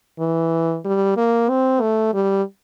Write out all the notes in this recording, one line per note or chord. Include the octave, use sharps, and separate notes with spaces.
E3
G3
A#3
C4
A3
G3